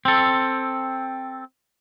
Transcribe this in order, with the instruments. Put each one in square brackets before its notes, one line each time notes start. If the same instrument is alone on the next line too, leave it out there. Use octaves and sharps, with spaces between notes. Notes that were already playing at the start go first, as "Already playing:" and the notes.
[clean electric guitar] C4 A4